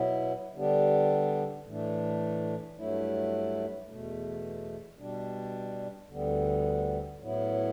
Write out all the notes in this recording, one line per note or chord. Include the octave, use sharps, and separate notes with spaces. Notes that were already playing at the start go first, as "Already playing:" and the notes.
Already playing: B2 F#3 B3 E4
D3 G3 B3 D4 G4
A2 E3 A3 D4
G2 F#3 A3 E4
E2 B2 A3
B2 G3 D4
D2 D3 G3 B3
A2 F#3 B3 E4